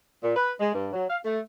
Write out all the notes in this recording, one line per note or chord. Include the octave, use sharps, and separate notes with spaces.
A#2
B4
G#3
G2
F#3
F5
A3